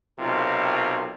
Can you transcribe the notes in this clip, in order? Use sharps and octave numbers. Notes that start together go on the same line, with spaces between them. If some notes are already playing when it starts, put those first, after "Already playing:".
B1 C3 F4 A#4